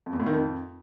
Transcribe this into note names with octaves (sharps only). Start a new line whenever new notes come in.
F2
E2
A2
D#3
F2